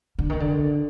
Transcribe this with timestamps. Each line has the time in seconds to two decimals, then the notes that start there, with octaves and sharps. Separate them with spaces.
0.19 D3
0.30 D#3
0.40 D3